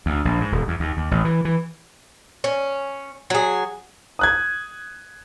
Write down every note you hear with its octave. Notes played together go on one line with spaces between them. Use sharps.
D2
A#1
G#2
D#1
E2
D#2
D#2
A1
E3
E3
C#4
F#3 G#4
D#6 F#6 G#6